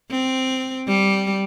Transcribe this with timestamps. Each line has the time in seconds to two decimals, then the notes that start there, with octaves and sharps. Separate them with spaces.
0.10 C4
0.87 G3